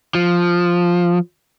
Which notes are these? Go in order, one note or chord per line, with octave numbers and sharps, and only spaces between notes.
F3